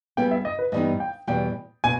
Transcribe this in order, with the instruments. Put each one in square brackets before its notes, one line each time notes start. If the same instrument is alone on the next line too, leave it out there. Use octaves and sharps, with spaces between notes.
[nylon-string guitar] G3 B3 E4 G#4 [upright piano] G5
[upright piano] E5
D#5
B4
[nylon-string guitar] G2 E3 G3 B3 D#4 [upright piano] D#5
[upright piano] G5
[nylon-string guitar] E2 B2 G3 [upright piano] G5
[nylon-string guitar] B2 [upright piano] G#5